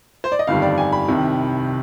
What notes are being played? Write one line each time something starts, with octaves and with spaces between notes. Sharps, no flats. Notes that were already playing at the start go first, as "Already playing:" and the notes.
C5
D5
D#5
G1 F2 D#3 G3 F5
D5
G#5
B5
C2 C3 D#3